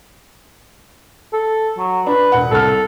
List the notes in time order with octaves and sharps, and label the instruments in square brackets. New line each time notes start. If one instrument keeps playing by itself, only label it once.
[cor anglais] A4
F#3
[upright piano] D4 [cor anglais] B4
[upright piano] E1 F#5
[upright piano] C2 A5 F6 [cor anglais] A4